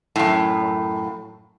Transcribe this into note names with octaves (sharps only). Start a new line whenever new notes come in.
F#2 A2